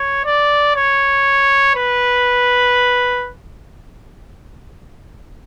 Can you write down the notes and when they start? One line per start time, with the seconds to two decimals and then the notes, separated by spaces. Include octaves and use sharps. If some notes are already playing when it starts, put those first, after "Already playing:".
Already playing: C#5
0.25 D5
0.76 C#5
1.76 B4